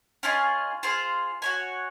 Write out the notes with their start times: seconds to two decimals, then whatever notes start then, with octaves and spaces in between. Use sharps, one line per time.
0.23 C#4 F4 G#4 D#5
0.83 F4 G#4 C5
1.42 F#4 C#5 G#5